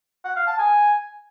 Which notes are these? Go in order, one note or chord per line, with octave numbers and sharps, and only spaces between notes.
F#5
F5
A5
G#5